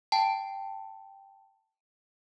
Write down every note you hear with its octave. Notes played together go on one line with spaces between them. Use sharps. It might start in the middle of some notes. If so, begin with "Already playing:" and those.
G5 A5